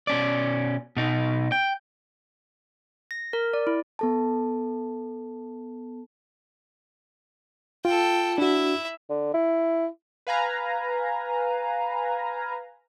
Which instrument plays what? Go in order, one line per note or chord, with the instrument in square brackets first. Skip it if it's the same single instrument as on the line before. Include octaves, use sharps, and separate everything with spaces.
[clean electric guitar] B2 C#4 D5
B2 D#4
G5
[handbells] A#6
A#4
D5
E4
[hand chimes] B3 A4 A5
[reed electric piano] F4 [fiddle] A4 G5
[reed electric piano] D4 F#4 [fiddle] E4 E5
[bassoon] D3
E4
[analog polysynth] B4 F5 G#5 A#5